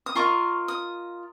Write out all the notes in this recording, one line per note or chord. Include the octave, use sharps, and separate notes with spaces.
D#6
F4 A#4 D#5 C#6
D#6